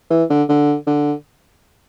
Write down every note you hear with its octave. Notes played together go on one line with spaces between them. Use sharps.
E3
D3
D3
D3